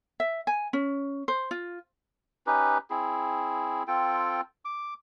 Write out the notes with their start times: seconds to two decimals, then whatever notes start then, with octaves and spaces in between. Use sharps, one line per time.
0.20 E5
0.47 G#5
0.73 C#4
1.28 C5
1.51 F4
2.47 C#4 D#4 G4 B4
2.90 C4 E4 G#4
3.88 C4 F4 A4 G5
4.65 D6